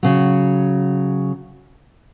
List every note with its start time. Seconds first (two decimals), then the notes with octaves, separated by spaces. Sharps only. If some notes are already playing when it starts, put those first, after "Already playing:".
0.03 C#3 F#3